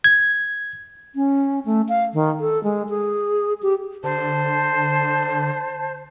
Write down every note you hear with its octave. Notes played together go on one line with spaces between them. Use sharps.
G#6
C#4
A3
F5
D#3
A4
G#3
G#4
G4
D3 C5 A5